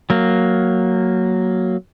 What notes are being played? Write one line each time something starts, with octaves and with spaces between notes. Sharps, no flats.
F#3 A#3